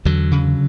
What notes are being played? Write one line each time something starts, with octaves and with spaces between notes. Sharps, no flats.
E2 D3 F#3
C#3